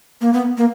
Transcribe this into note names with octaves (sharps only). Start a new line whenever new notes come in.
A#3
B3
A#3